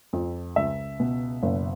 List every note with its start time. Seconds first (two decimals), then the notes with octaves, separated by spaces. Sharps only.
0.13 F2
0.56 C#2 E5
1.00 B2
1.43 F#1